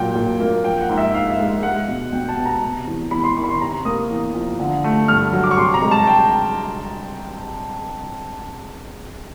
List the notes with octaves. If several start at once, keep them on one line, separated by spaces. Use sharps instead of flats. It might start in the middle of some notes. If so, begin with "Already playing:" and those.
Already playing: A#2 F#3 G5
A#2
A#3
F3 G5
F#5
G#2
E5
G#2 F5
E5
G#3
F5
G#3 F#5
B2
B2 G5
A5
B3
A#5
C3
E2
E2 B5
C6
D#3 C#6
B5
C6
C3 A#5
A#3 D#6
E2
F3
D3
A3
G2 F6
F#3
D6
C#6
C3 C6
A#5
G#3
A5
G5